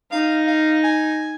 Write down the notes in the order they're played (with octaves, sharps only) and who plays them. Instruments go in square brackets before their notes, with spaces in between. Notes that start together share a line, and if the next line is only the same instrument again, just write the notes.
[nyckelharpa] D#4 [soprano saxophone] F5
[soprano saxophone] F5
G#5